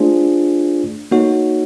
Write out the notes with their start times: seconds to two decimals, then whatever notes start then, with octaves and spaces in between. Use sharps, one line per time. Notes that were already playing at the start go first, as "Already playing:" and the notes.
Already playing: A3 D4 F4 G#4 C5
1.11 A#3 D#4 F#4 A4 C#5